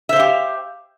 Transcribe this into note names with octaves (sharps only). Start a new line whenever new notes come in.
G4 C5 E5 F5